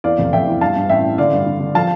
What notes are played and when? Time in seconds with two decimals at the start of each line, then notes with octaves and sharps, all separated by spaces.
0.04 E2 D5 F5
0.19 F1
0.33 F1 E5 G5
0.48 E2
0.61 G2 F5 A5
0.76 G2
0.89 A1 E5 G5
1.04 A1
1.18 D3 D5 F5
1.33 G2
1.47 D3
1.60 D3
1.74 F3 F5 A5